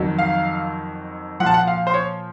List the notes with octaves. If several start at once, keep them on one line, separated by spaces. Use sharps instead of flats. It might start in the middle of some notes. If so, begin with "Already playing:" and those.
Already playing: F2 D#3 F#3
F5
A#2 F3 F#5 A5
F#5
F5
C5
C#5